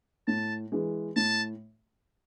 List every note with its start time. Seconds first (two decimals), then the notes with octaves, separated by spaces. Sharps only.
0.27 A2 A5
0.72 E3 G#3
1.16 A2 A5